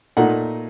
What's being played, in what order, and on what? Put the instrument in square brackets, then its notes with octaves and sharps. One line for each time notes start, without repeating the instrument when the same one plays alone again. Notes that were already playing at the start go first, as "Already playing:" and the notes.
[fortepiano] A#2 A3 D#4 F#5